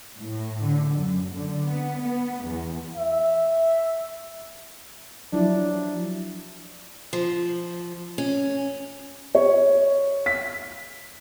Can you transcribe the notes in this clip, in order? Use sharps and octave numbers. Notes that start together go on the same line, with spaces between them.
A2
D3
F#2
D3
B3
B3
E2
E5
F3 F#3 D4 E4
F3
C#4
C#5
B6